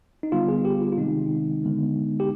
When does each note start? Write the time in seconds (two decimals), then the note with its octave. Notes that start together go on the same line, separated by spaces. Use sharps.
0.23 D#4
0.32 D3 G3 B3 F4
0.48 G#4
0.65 G4
0.81 F4
0.92 F4
0.98 C3 D#3 G#3 C4 D#4
1.63 D3 G#3 B3
2.20 G4